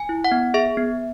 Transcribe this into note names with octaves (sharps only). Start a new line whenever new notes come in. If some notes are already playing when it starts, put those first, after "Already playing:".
Already playing: G#5
E4
F#5
B3
G#4 E5
B3